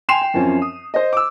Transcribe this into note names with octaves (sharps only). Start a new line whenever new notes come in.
G5 G#5 C6 C7 E7 F7
G5
F#2 F3 C4 C#4
D#6
C5 D#5
D6 E6